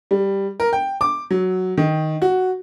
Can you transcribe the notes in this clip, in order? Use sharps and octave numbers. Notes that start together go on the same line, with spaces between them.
G3
A#4
G5
D6
F#3
D#3
F#4